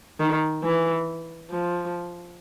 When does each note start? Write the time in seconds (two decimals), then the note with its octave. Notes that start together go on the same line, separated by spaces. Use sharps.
0.20 D#3
0.64 E3
1.50 F3